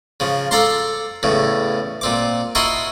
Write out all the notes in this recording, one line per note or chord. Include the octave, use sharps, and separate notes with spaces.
C#3 F3
A4 D5 F5 A5 A#5 C6
E2 A2 C#3
A#2 C4 D6
E4 F#4 A#4 D#5 A5 C6